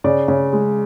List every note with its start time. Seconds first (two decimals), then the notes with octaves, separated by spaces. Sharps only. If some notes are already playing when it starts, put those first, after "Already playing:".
0.04 C#3 D5
0.28 C#3
0.53 G#3